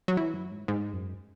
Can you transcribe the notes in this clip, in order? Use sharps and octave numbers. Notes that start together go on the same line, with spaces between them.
F#3
E3
F#2
G#2
G#2
F#2